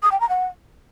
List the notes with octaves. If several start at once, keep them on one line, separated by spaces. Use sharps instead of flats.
D#6
G5
A#5
F#5